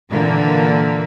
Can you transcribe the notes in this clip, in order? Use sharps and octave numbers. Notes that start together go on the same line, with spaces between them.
A#2 D3 E3 A#3